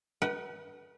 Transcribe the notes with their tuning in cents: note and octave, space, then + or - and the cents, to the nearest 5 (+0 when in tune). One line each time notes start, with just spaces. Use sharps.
B4 -35 F#5 +30